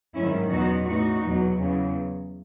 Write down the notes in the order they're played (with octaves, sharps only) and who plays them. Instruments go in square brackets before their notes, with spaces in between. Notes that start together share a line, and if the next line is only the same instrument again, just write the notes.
[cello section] G#2 D#3 F#3 C#4 E4
E2 B2 F#3 D#4 F#4
A2 E3 D#4 F#4
E2 B2 F#3
E2 C#3 F#3